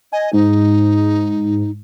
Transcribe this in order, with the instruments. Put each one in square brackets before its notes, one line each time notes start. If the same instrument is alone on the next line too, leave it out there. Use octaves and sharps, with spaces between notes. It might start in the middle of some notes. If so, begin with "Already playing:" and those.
[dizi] D#5 [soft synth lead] G#5
[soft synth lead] G#2 [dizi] D#4